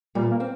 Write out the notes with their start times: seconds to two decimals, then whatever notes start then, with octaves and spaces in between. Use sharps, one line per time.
0.15 A#2 G3
0.31 A#3
0.40 C4